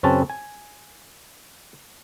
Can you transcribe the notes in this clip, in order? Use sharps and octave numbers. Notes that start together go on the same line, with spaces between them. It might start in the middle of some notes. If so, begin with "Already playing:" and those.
F#2 C#3 C4 C#4 B4 A5
G#5